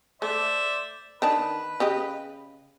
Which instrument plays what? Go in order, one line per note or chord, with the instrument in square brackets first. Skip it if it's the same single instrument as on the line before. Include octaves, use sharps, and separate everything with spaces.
[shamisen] A3 [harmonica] C5 D5 E5
[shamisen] D#3 D4 A5 [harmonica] B4
[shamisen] C#3 G4 D#5